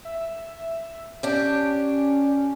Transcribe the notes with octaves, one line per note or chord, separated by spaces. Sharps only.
E5
C#4 D4 G4